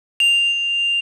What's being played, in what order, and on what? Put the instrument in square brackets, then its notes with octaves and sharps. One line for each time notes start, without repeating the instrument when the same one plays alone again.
[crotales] F7